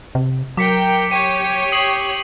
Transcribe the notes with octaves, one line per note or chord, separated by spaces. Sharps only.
C3
F#3 A#4 G5 D6 B6 C#7
G4 C#5 D#7
D#6 C7 F#7